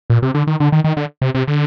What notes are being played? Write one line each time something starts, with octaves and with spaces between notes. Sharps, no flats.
A#2
C3
D3
D#3
D3
D#3
D#3
D3
C3
C3
D3